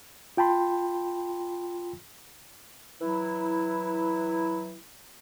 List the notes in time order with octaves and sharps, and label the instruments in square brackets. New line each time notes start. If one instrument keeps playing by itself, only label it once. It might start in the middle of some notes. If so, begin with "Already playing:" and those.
[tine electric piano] F4 G5 A5 B5 C6
[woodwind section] E3 F#3 E4